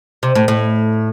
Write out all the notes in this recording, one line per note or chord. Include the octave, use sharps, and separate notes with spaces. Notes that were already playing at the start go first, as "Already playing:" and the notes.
C3
A2
A2